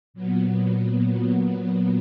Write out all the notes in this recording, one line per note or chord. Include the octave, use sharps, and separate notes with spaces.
A#2 F#3 B3